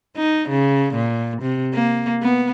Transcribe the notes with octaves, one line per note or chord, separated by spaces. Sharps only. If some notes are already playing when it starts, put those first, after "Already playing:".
D#4
C#3
A#2
C3
A#3
B3